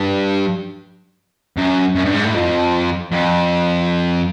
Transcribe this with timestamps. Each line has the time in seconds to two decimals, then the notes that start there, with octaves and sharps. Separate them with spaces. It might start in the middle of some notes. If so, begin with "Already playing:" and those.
Already playing: G2
1.57 F#2
1.95 F#2
2.05 G2
2.14 G#2
2.25 A2
2.34 F2
3.12 F2